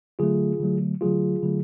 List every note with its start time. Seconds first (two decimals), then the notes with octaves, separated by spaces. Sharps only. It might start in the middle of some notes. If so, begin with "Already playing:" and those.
0.19 D3 F#3 A3 F4 G#4
0.60 D3 F#3 A3
1.01 D3 F#3 A3 F4 G#4
1.43 D3 F#3 A3